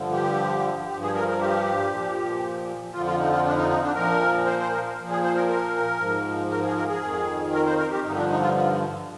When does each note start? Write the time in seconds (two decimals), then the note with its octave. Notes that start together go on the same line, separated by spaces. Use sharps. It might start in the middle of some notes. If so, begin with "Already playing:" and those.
Already playing: G2 D3 F3
0.12 G4
0.89 G2 F3 G4
1.02 G#4
1.15 A#4
1.28 A#4
1.40 G4
1.91 A#2 F3
2.93 F2 D3 F3 F4
3.07 F4
3.20 D#4
3.31 F4
3.45 D4
3.57 D#4
3.70 D#4
3.83 D4
3.95 A#2 F3 A#4
4.46 C5
4.59 C5
4.72 A#4
4.98 A#2 F3
5.10 G#4
5.23 C5
5.36 A#4
5.48 A#4
6.00 G#2 F3
6.51 A#4
6.64 G#4
6.75 A#4
6.89 G#4
7.01 F2 D#3
7.53 A#4
7.66 C5
7.78 A#4
7.91 G4
8.03 G2 D3 F3 D#4
8.15 D4
8.29 D#4
8.41 F4